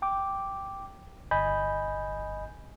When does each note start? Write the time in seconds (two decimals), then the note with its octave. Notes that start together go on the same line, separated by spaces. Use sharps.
0.02 G5 D6
1.31 G1 D#5 G#5 B5 G6